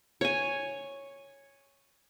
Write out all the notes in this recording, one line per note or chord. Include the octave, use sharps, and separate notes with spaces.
C#5 G#5